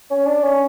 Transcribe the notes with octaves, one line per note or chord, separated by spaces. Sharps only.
C#4
D4
C#4